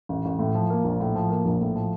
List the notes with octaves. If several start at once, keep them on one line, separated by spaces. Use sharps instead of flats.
A1
A1
A2
F3
A#3
A#1
A2
F3
A#3
A#1
A2
F3